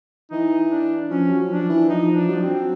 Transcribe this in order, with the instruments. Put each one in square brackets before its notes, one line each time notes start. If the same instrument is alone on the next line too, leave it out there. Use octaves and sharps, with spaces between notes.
[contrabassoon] E3 [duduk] D#4
[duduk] D4
[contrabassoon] F3 [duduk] C#4
[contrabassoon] F#3
[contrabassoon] F3 [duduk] D4
[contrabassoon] E3
[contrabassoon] F3 [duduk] D#4
[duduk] D4
[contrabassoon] F#3
F3
[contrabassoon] F#3 [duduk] C4